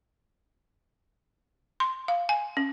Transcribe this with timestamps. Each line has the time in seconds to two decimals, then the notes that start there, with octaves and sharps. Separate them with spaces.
1.80 C6
2.08 F5
2.29 G#5
2.57 C#4